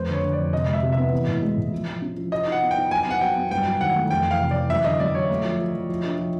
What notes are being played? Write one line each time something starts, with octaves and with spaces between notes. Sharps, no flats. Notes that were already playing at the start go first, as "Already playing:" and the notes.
Already playing: F2 A3 B4 C5
D3 C#5
D3
F2 D5
C3 D#5
G#3
E5
C3
E5
B3
E3
A2
G#3
A2
F3
F3
C#4
F3
F#4 D#5
D#4
F#5
B3
G5
D#4
F#3 G#5
B3 F#5
F#3 G5
B3
G2 G5
F#3
D#3 F#5
A3
F2 G5
E3
F5
C3
E3 D5
F#2 E5
D3 D#5
F#2 D5
F#3 C#5
A3
F3
F3
F3
F3
D4
F3